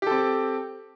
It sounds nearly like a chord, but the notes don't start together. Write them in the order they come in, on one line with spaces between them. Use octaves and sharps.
G4 A4 C4